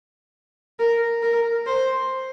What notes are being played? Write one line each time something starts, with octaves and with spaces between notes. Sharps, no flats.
A#4
A#4
C5